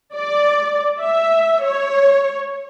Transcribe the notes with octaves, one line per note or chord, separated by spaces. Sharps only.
D5
E5
C#5